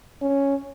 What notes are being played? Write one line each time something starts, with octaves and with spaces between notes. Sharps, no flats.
C#4